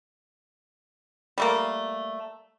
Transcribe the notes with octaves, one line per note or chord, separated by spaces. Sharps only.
G3 A3 A#3